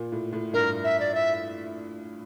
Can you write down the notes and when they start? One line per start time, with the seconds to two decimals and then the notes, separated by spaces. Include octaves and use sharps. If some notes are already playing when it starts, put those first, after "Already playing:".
Already playing: A#2
0.12 A2
0.33 A2
0.54 G2 A#4
0.84 E5
1.00 D5
1.15 E5